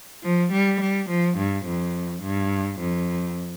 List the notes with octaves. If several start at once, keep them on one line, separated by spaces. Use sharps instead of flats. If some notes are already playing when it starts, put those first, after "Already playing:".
F3
G3
G3
F3
G2
F2
G2
F2